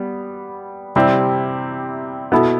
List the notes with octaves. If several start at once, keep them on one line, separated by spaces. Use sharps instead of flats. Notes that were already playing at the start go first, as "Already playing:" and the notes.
Already playing: G3 B3
C3 G3 C4 E4
B2 B3 E4 A4